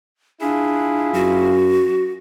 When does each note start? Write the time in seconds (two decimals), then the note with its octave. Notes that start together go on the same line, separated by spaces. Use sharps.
0.41 D4 E4 F4 G#4
1.14 F#2 F#4